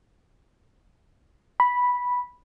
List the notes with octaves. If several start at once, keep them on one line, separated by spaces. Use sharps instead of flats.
B5